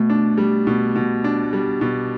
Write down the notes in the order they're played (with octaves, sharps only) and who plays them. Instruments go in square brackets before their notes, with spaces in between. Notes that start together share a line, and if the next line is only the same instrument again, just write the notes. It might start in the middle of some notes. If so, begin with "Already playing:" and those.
Already playing: [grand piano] B2 [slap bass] A3
[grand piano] D4
G3
B2
B2
D4
G3
B2